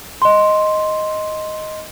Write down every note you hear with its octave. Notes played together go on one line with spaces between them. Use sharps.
D#5 C6